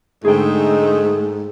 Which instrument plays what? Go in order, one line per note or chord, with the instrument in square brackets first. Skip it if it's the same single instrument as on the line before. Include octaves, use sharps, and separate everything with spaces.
[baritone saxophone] G#2 [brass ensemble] D3 G#3 D#4 [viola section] A3 [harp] G#4 G5